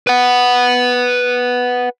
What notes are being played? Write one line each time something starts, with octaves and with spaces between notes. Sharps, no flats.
B4 F#5